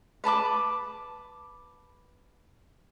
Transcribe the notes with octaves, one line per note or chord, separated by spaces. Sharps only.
B4 A5 B5 D6